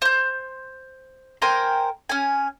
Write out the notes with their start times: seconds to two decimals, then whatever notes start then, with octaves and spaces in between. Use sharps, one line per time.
0.02 C5 G6
1.42 A#4 C5 G5 G#5
2.09 C#4 G#5